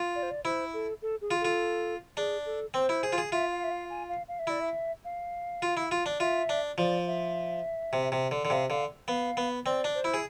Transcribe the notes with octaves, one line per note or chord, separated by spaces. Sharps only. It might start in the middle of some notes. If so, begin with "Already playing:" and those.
Already playing: F4
D5
C5
D5
E4 C5
A4
A4
G#4
F4
F4 A4
D4 G#4
A4
C4 C5
E4
G#4
F4
G#4
F4 E5
F5
E5
F5
G#5
F5
F5
E5
E4 D5
E5
F5
F4
E4
F4
D4
F4 E5
D4
F3 D5
E5
C3
C3
D3
D3
C3 F5
D3 F5
B3 F5
B3
C4 D5
D4
C5
E4
G#4